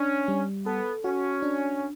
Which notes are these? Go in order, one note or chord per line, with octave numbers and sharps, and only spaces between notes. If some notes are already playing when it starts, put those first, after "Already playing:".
Already playing: C#4 D4
G3
B3 A4
C#4 F#4
D4